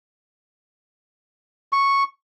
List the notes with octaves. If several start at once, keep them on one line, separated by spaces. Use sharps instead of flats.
C#6